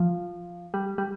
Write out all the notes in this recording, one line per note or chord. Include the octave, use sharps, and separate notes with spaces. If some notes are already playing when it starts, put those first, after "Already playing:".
Already playing: F3
G3
G3